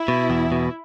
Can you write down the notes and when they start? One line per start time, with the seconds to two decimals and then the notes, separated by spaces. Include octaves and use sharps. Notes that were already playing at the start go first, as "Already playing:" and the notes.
Already playing: E4
0.08 B2
0.30 E2
0.52 B2